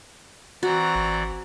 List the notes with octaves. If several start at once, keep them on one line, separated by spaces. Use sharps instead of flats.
E3 C4 F#4 D5 A#5
G#1